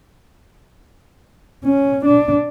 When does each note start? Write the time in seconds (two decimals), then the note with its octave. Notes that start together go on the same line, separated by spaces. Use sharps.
1.64 C#4
2.05 D4